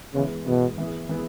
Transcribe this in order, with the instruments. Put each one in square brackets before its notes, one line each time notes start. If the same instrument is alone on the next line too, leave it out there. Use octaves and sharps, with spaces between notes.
[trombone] C#3 [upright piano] E3 G#3 B3
[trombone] B2 [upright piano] E3 G#3 B3
[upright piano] E3 B3 E4 G#4
E3 B3 E4 G#4